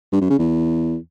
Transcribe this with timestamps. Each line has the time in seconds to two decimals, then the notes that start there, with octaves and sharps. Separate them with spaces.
0.13 G2
0.21 F#2
0.30 C#3
0.39 E2